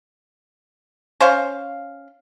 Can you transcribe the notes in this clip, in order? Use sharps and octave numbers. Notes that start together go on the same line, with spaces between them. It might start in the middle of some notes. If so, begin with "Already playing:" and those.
C#4 C5 F5